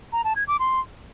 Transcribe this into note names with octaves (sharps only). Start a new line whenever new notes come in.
A#5
A5
G#6
D6
C6